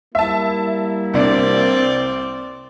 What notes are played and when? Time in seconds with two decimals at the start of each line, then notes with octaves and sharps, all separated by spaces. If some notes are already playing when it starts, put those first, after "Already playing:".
0.15 G3 A#3 E4 E5 A5
1.14 C2 C4 D4 D5